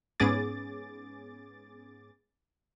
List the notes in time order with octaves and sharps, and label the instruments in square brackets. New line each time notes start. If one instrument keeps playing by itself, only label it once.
[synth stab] G#2 B3 C#4 G#4 D6 A6